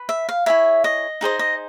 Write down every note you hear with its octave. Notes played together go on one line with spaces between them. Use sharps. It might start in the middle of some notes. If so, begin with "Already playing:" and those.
Already playing: B4
E5
F5
E4 G#4 C#5 E5
D#5
D#4 G#4 C5 D#5
D#5